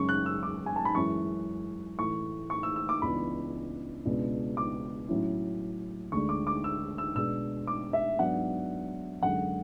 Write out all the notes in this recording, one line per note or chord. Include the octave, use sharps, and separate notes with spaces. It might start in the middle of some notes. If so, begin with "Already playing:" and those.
Already playing: F#2 C#3 G#3 C#4 C#6
F#6
E6
D6
G#5
A5
B5
F#2 E3 G#3 C#4 E4 C#6
A2 E3 A3 C#6
C#6
E6
E6
D6
C#2 C#3 E3 B3 D4 B5
C#2 B2 G#3 B3 D4
D6
A2 F#3 C#4 E4
D2 D3 G#3 D4 C#6
D6
D6
E6
E6
B2 G#3 D4 E6
D6
E5
G#2 F#3 B3 D4 F#5
F#2 D3 G#3 F#5